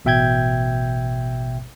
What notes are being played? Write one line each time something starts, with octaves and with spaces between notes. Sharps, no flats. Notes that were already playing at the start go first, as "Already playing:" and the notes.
A1 B2 E5 G5 G6 G#6